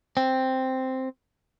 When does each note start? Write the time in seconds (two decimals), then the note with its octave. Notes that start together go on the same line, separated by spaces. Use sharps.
0.17 C4